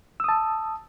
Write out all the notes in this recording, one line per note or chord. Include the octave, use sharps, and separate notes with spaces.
A5 D#6 E6